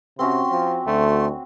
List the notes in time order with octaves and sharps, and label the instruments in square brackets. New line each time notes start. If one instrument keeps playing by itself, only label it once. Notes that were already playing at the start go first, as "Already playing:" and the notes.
[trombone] C3 [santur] C4 C#4 F#4 [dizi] C6
[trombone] F3
[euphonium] D2 [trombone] A3 [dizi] C6